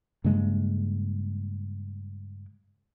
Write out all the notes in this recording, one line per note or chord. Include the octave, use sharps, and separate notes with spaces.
G2 C#3 G#3 A#3